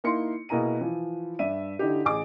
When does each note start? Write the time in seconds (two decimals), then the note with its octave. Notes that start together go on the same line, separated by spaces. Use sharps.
0.04 A#3 D#4 E4 C6 C#7
0.49 B2 A#3 E4 G#4 A#5 D#7
0.81 E3 F3
1.39 G2 D5 E5 D#7
1.79 D3 D#4 E4 G4
2.05 A1 G#4 D6